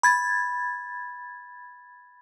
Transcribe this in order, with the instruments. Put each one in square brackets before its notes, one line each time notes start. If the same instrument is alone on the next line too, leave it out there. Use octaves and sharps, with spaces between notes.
[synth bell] B5 G#6 A6